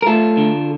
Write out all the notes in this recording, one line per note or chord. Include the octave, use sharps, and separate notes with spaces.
A#4
A3 F4 A4
D3